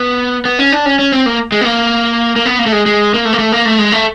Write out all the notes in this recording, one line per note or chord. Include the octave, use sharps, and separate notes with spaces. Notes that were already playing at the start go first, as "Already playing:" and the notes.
Already playing: B3
B3
C#4
D4
C#4
C#4
C4
A#3
G#3
B3
A#3
A#3
B3
A#3
A3
G#3
G#3
A#3
A3
A#3
A3
A#3
A3
G#3
A3